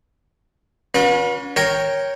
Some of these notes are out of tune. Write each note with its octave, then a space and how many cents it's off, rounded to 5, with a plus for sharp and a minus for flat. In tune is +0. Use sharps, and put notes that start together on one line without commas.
C#4 +35 F#4 -45 B4 -35
A#4 +0 C#5 +0 G5 +0